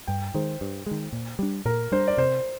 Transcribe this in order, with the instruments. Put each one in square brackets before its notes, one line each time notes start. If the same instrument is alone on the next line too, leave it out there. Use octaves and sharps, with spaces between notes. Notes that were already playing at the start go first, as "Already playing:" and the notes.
[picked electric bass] G2 [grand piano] G5
[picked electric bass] D#3 G#3 [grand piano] C5
[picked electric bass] G2
D#3 G#3
A#2
G3 D4
[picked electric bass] A#2 [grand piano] A#4
[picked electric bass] G3 D4 [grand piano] C5
[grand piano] D5
[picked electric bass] C3 [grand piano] C5